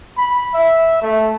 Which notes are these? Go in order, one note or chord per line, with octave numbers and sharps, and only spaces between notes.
B5
E5
A3